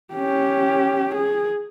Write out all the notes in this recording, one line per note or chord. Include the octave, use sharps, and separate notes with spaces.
C#4 G4
G#4